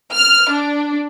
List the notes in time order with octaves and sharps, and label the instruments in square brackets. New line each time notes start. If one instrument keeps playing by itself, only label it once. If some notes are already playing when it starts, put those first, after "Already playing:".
[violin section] F6
D4